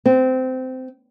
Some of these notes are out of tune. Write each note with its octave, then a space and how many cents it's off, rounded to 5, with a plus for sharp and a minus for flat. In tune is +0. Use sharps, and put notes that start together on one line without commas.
C4 -20